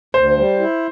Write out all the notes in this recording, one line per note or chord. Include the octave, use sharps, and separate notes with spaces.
D2 C5
G3
E4